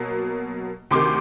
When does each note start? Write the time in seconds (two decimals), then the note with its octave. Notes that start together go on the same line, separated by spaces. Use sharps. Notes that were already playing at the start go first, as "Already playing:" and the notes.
Already playing: B2 F#3 A#3
0.91 D2 C3 D#3 C6 D6